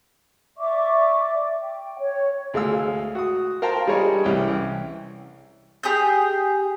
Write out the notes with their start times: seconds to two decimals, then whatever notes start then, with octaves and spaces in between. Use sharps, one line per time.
0.58 D5 E5 C#6 D6
1.62 G5
1.98 C#5
2.54 D2 G#3 F5 E6
3.15 F#4 D#6
3.62 A#4 C5 F5 G5 A5 A#5
3.87 G3 G#3 D4 C#5 D#5
4.24 C2 E3 C#4 G5
5.83 G4 G#4 G5 G6